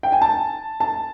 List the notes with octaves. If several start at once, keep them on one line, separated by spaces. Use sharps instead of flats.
G5
G#5
A5
A5